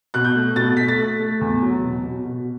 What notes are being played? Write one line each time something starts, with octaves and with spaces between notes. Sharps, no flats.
B2 F#6
G6
A3
B2 A6
A3 B6
A6
A3
A3
E2
F#3
B2
B2
B2